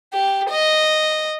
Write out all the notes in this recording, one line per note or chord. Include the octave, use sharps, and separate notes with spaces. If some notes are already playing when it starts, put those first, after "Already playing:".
G4
D#5